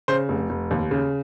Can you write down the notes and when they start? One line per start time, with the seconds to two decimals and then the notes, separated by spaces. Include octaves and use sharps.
0.08 C#3 C5
0.29 F1
0.50 F1
0.71 D#2
0.91 C#3